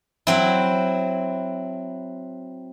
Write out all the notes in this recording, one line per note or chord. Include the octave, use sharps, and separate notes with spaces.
F#3 C4 E4